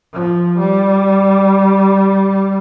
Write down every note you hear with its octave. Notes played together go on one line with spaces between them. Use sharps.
F3
G3